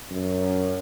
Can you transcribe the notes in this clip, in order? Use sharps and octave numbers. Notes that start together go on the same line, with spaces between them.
F#2